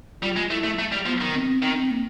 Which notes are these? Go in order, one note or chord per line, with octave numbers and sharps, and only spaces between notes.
G3 F4
G#3
A3 E4
A3
A3
G3
F3 B3
D#3
C4
D#3 C4
A#3